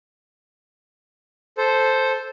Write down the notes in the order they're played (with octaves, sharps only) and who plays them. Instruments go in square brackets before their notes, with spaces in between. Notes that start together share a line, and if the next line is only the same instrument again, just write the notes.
[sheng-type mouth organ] A4 C5